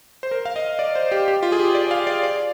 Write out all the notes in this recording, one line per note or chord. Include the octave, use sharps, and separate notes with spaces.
C5
A#4
F5
D#5
D5
C5
G4
G4
F4
G#4
G4
D5
F5
D5
D5